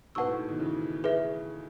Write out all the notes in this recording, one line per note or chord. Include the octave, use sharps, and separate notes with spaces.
G#2 B2 B4 F#5 A5 C#6 E6
A2
G#2
B2 D#3
C#3 E3
G#4 B4 E5